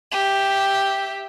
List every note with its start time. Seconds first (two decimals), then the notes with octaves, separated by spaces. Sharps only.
0.12 G4 E5